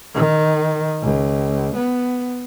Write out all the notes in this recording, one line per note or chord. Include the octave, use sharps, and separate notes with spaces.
D#3
C#2
B3